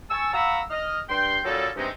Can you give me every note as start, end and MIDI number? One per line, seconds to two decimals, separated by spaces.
0.10 0.32 80
0.10 0.32 81
0.10 0.32 85
0.10 0.32 88
0.34 0.60 77
0.34 0.60 78
0.34 0.60 82
0.34 0.60 83
0.34 0.60 85
0.34 0.60 88
0.70 0.99 75
0.70 0.99 89
1.09 1.39 43
1.09 1.39 79
1.09 1.39 84
1.44 1.69 46
1.44 1.69 54
1.44 1.69 55
1.44 1.69 61
1.44 1.69 63
1.44 1.69 69
1.76 1.89 43
1.76 1.89 48
1.76 1.89 56
1.76 1.89 60
1.76 1.89 61
1.76 1.89 63